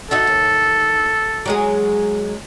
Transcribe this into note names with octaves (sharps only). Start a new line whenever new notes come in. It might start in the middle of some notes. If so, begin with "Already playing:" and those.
D#4 F#4 A4 E5
D#2
F#3 G#3 G#4